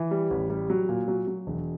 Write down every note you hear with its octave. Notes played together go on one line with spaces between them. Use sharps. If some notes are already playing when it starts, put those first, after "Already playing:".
Already playing: E3
G3
A1
G3
F#3
A#2
F#3
F#3
E1